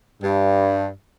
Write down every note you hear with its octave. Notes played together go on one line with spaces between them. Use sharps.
G2